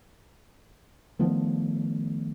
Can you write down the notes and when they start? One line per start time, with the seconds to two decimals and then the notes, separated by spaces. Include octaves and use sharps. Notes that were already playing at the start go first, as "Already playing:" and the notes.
1.19 D#3 F3 A3 B3